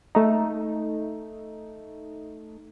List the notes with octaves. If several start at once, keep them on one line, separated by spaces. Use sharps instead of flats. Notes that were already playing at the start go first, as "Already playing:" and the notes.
A3 D#4